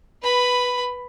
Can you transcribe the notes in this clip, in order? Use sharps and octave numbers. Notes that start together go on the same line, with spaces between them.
B4 B5